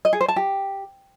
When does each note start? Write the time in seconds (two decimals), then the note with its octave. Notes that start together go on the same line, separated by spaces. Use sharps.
0.05 D#5
0.13 G#4
0.21 C5
0.28 A5
0.36 G4